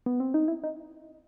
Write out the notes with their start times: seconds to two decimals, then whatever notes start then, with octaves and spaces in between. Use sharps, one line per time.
0.06 B3
0.20 C4
0.34 D#4
0.48 E4
0.64 D#4